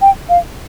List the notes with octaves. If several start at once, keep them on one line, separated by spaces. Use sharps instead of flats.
G5
F5